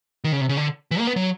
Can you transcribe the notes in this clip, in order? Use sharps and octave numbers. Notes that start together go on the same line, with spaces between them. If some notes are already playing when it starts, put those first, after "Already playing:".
D#3
C#3
C3
C#3
D3
E3
A#3
B3
F#3